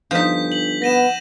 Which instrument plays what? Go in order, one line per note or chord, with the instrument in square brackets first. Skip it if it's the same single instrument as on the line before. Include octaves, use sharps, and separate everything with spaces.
[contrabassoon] G1 [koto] F3 D#4 [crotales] G6 B6
[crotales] F#7
[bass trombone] B3 [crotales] A#6 D#7 E7